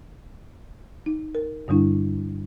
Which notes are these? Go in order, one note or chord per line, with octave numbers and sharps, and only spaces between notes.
D#4
A#4
G2 D3 G3 D4 E4